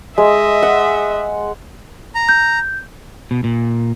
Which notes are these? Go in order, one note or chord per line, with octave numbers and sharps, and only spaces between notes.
G#3 D#5 E5
F#5
A#5
G6
B2
A#2